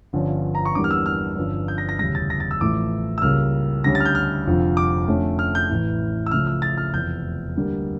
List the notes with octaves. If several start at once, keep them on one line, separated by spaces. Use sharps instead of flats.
G1 G2 D3 F3 C#4
A#5
C#6
E2 D3 G3 A#3 D6
F6
E6
F6
G1 G2 F3 C#4
G6
A#6
A#6
E1 D2 C#3 G3 A#6
A6
A#6
A6
E6
A1 A2 F3 A3 D6
E6
C#2 C#3 G3 A#3 F6
D2 D3 G3 C#4 A#6
A6
F6
G6
F6
F1 F2 D3 F3
D6
F2 D3 A3 C#4
F6
G6
A1 A2 E3
E6
C#2 C#3 F3 A3 F6
E6
A6
F6
F1 E2 E3 G6
D2 D3 G3 A#3